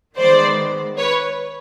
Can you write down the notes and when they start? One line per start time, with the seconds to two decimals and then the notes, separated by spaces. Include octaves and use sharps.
0.18 D#3 G#3 B3 C5 D5
0.98 B4 C#5